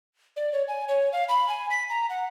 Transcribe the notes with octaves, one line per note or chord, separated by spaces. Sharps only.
D5
C#5
G#5
C#5
F5
B5
G#5
B6
A#5
F#5